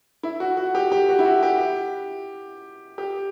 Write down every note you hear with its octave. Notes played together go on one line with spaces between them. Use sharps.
E4
F#4
F#4
G4
G4
F#4
E4
F#4
G4
G4